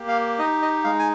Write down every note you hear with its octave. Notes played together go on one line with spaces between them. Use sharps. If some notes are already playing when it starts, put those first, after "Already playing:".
Already playing: A#3 G4
F5
D#4 D#5
D#5
G#3 F5
G#5